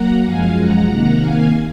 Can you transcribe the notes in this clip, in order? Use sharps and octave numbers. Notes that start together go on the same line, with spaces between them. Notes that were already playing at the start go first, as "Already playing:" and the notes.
Already playing: F#3 A#3 F#5 A#5
F#2 F3 G#3 F5 G#5
F#5 A#5
C3 D#3 A#3
F5 G#5